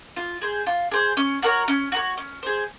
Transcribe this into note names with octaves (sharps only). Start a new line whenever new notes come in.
F4
G#4 C5
F4
G#4 C5
C#4
F#4 A#4 C#5
C#4
F#4 A#4 C#5
C#4
G#4 C5